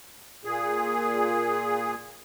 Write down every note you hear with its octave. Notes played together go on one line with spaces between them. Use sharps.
A#2 G#4